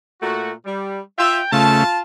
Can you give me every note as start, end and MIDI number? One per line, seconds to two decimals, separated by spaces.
0.22 0.52 46
0.22 0.52 57
0.22 0.52 66
0.66 1.00 55
1.19 1.40 65
1.19 1.40 76
1.19 1.51 79
1.53 1.84 49
1.53 1.84 57
1.53 2.02 65
1.53 2.02 77
1.53 2.02 81